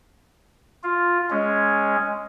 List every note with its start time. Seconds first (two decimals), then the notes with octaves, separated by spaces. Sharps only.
0.83 F4
1.30 G#3 C#4